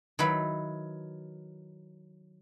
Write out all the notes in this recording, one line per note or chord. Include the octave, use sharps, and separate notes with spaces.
D#3 F#3 E4 B4